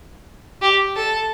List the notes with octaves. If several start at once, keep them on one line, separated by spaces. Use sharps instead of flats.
G4
A4